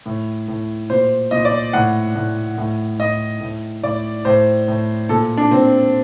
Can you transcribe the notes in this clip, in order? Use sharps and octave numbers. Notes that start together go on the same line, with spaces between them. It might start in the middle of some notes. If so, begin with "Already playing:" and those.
A2
A2
A#2 C5
A#2 D#5
D5
A2 F#5
A2
A2
A2 D#5
A2
A2 D5
A2 C5
A2
A#2 A4
D4
A#2 C4